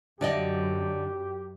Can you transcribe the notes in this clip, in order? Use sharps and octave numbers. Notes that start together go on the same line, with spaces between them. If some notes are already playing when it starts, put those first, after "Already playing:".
F#2 D3 G4 D5 D#5